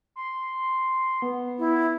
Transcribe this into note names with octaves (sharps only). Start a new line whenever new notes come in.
C6
B3
E4